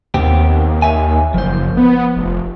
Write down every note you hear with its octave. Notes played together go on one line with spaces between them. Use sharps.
D#2 B3 C4 G4
C#5 E5 G#5
F#1 F3 C5
B3
F1